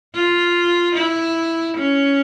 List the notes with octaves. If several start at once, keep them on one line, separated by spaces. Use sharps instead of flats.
F4
E4
C#4